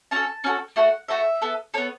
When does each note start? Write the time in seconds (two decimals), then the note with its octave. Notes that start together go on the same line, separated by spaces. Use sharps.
0.11 C#4 F#4 A4 A5
0.44 C#4 F#4 A4
0.76 A3 F#4 A4 F#5
1.08 A3 F#4 A4 E5
1.42 B3 A4
1.74 B3 A4 C#5